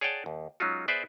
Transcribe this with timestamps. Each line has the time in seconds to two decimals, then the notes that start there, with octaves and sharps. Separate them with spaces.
0.01 G#4 C#5 D5 F#5 G5 A5
0.26 D#2
0.60 F#3 G#3 C#4 D#4 F4 F#4
0.88 B3 G#4 B4 C5 D5 E5